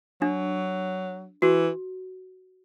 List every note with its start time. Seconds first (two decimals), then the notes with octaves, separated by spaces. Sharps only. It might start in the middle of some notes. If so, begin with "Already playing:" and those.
0.21 F#3 D4
1.42 E3 F#4